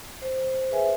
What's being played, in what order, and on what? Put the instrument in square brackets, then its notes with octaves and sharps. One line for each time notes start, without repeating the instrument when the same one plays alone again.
[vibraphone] C5
G#4 B4 C5 E5 G#5